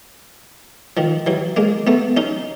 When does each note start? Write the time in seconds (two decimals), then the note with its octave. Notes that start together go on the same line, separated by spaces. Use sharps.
0.97 D#3 F3
1.26 E3 F#3
1.57 G#3 A#3
1.87 A3 B3
2.17 C#4 D#4